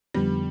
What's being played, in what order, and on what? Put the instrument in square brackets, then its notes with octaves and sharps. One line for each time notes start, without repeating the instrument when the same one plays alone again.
[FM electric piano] F2 D3 F3 B3 [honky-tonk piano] G3